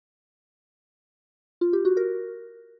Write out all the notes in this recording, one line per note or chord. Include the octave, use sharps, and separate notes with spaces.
F4
G4
F#4
A#4